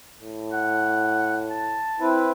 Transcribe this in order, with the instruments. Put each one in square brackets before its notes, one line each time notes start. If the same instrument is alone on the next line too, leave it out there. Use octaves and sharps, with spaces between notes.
[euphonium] A2
[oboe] F#5
A5
[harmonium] C4 E4 B4